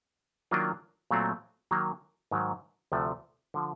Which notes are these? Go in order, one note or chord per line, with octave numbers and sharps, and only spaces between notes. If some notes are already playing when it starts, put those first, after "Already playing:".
D#3 F#3 A#3 D4 F4
A#2 F#3 A3 C4
D#3 F#3 A#3
G#2 D#3 F#3
D2 C3 F3 A3
D3 F3